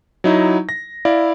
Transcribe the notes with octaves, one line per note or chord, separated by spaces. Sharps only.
F#3 D#4 E4
A#6
E4 D5 F5